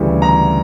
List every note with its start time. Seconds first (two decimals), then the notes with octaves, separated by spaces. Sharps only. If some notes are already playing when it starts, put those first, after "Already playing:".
Already playing: D2 C#3 E3 G3
0.22 A#5